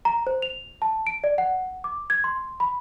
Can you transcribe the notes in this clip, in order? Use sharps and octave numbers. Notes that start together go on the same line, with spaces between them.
A#5
C5
F7
A5
D7
D5
F#5
D6
G#6
C6
B5